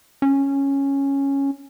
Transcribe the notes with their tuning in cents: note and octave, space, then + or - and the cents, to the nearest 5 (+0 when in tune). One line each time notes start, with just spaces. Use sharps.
C#4 -5